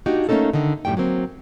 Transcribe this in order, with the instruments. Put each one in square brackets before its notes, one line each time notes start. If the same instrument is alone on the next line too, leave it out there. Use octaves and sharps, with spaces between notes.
[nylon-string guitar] A#3 D4 D#4 F#4 G4
A3 A#3 C4 C#4 D#4 A4
D3 D#3 D#4
F#2 A2 G3 A3 G5
F#3 A#3 C4